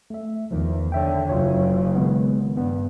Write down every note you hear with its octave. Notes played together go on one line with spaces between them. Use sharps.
A3 E5
E2 D#3 F3
D3 C#5 E5 G5
F#1 C#3 F4 C#5
D#3 G#3 B3
G2 B3